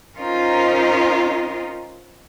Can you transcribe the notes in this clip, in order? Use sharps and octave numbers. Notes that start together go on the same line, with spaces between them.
C#4 D#4 F4 A#4 C5 D#5